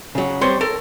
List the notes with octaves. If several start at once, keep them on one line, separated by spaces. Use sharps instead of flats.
C#3 F#3
G3 C4 C#5 C6
A4 A#4